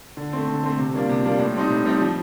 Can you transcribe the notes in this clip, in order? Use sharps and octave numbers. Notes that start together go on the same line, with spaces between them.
D3
A3 C4
D3
A3 C4
C3
G3 A#3 D4 F4
C3
G3 A#3 D4 F4
A2
G3 C4 D#4
A2
G3 C4 D#4
F3